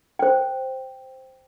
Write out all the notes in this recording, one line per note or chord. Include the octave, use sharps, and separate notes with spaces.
C5 G5